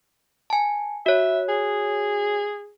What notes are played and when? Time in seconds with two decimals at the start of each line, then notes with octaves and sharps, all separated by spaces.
0.50 G#5 A5
1.06 F#4 C#5 E5
1.49 G#4